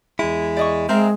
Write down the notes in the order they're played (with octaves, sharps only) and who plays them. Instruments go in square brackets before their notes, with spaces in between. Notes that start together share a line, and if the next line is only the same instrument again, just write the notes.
[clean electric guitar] E2 E4 [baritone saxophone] G#3
[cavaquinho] D5 D#5 C#6
[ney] G#3 [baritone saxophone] C4 [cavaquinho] A#4 E5 F5